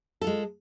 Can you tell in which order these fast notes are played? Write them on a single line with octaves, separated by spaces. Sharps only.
A4 F4 G#3